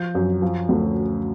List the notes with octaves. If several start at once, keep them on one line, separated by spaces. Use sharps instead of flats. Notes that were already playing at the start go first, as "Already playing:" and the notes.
Already playing: F3 G6
F#2
F3
D2